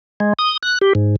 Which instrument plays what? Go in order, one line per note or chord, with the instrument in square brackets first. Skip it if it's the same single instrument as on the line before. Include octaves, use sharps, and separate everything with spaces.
[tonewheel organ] G#3
D#6
F#6
G4
G#2